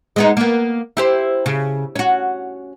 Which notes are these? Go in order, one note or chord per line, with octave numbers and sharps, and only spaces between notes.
G#3 B3 D#4
A#3 B3
E4 G4 C5
C#3
C#4 F#4